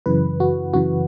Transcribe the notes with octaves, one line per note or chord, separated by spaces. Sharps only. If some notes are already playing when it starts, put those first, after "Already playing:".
F#2 C#3 E3 B4
F#4
F#2 C#3 E3 F#4